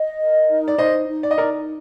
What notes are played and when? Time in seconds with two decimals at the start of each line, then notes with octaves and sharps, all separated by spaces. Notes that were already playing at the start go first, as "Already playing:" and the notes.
Already playing: D#5
0.18 A#4
0.49 D#4
0.68 D5
0.78 D#4 C5 D#5
1.08 D#4
1.23 D5
1.31 D#5
1.38 D#4 A#4 D5